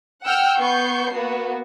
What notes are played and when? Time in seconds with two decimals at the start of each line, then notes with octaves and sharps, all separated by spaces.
0.24 F#5 G5 E6 F6
0.59 B3 C#6 G6 C7
1.14 A#3 B3 F#4